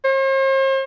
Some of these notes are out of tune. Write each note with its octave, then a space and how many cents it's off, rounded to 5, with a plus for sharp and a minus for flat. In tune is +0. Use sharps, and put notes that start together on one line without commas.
C5 +45